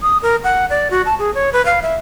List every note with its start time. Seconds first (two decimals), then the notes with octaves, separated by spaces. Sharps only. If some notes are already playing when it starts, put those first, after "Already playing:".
0.02 D#6
0.22 A#4
0.44 F#5
0.70 D5
0.91 F#4
1.06 A5
1.19 G#4
1.35 C#5
1.53 B4
1.65 F5
1.82 E5